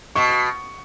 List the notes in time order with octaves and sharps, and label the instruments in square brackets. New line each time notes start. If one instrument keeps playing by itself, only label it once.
[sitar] B2 [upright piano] C#6